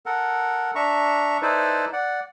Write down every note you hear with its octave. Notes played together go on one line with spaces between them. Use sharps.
A4 A#4 F#5
D4 E5 A#5 C#6
D#4 E4 A4 B4 C5 D5
D5 F#5